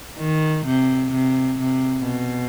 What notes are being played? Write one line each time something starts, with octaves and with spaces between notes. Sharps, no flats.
D#3
C3
C3
C3
B2